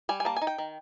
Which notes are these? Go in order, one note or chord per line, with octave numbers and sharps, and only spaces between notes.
G3 G#5
G#5
A#3 A5
G#5
D#4
G5
D#3